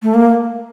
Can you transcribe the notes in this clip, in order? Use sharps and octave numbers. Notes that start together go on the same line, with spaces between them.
A3
A#3